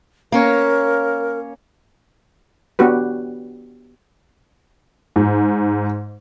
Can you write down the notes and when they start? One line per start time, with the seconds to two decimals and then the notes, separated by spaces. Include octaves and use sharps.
0.32 A#3 C#4 A#4 C#5
2.79 B3 D4 F#4 G4 B4
5.16 G#2